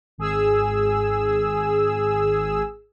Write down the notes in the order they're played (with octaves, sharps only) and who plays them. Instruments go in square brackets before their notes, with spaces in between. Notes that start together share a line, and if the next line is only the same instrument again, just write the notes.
[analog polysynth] G#1 G#4 E6